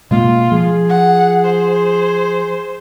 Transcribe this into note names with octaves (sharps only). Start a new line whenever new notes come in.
B2 G#3 A#3 F4
F3 G#4
F#5
C5